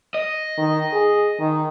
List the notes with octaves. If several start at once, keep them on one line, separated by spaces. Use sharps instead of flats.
D#5
D#3
G#4
D#3